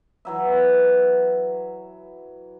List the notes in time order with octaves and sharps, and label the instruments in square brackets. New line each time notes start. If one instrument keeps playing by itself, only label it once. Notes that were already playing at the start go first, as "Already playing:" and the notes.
[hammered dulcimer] E3 F#3 E5